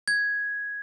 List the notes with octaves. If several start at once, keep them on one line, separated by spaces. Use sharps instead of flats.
G#6